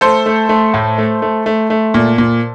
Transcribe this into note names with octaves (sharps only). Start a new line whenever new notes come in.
A3 A4 C5
A3
A3
A2
A3
A3
A3
A3
A#2
A#2